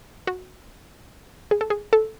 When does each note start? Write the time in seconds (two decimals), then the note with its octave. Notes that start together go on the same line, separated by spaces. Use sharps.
0.27 F#4
1.51 G#4
1.61 A4
1.70 G#4
1.93 A4